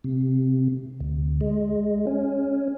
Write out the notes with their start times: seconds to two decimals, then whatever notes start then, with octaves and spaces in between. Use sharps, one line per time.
0.04 C3
1.00 D2
1.41 G#3
2.07 C#4